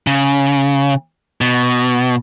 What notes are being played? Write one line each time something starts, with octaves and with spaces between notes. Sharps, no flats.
C#3
B2